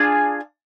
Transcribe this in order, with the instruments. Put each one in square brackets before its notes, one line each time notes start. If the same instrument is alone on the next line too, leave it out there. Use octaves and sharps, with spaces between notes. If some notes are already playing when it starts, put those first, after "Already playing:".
Already playing: [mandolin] D4 F4 G#4